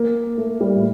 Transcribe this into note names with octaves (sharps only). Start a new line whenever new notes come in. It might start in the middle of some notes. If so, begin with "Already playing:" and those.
Already playing: A#3
A3
G3
A2